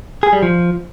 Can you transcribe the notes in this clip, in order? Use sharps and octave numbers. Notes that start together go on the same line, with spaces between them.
G#4
G3
F3